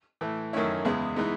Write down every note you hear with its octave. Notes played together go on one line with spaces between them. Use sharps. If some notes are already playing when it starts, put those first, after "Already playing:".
A2 E3 A3
F#2 D#3 A3 C#4 E4
E2 C#3 G#3 B3 E4
E3 G#3 B3 D#4